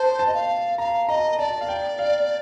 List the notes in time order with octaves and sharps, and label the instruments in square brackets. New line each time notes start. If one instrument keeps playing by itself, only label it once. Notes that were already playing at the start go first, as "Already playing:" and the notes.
Already playing: [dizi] C5 [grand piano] A5
[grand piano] A5
[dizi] D#5
F5
[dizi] F5 [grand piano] A#5
[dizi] D#5 [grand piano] A#5
[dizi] D5 [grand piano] A5
[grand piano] F5
G5
F5